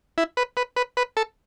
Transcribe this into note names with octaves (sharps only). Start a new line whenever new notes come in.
E4
B4
B4
B4
B4
A4